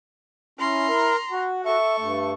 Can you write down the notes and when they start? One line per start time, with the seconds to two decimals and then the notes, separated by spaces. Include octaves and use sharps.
0.59 C#4 E4 A#5 C6
0.88 A#4
1.31 F#4 F#5
1.65 A4 E5 C#6
1.99 G2 A3